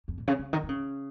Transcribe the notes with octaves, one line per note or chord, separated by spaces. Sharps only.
F2
A#2
C#3
C#3
D#3
D#3
C#3